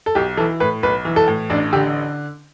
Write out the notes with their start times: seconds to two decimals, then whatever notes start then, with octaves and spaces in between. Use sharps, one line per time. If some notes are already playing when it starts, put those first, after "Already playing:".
0.06 A4
0.15 B1 G4
0.37 E3 A4
0.60 A2 B4
0.83 B1 B4
1.05 E3
1.16 A4
1.28 A2
1.50 A1 D4
1.73 D3 G4